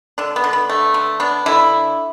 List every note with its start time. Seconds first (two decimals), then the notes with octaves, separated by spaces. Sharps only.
0.18 D3 D4
0.36 B3
0.44 D3
0.53 B3
0.69 A3
0.94 D3
1.20 B3 D4
1.46 D3 E4